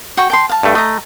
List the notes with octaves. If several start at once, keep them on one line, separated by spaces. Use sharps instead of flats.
F#4 G5 C#6
G5 A5 C6
F5 A5
G2 A3
A3 D#5 A#5